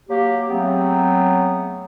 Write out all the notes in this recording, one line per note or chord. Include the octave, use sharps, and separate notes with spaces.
F#3 A#3 G4
C#3 F#3 A3 B3 C4